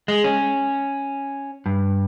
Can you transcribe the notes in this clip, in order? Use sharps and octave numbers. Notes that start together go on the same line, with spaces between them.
G#3
C#4
G2